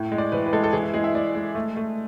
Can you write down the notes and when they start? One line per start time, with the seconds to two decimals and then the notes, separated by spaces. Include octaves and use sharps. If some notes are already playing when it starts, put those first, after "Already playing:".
Already playing: A2
0.12 G#3
0.18 D5
0.32 E3 B4
0.46 B4
0.53 G#3 A4
0.64 A4
0.73 E3 G#4
0.83 E4
0.94 G#3 G#4
1.04 E5
1.14 G#3 D5
1.35 G#3
1.55 A3
1.77 A3